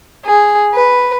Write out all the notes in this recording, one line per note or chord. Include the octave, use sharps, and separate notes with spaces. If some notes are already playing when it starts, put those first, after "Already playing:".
G#4
B4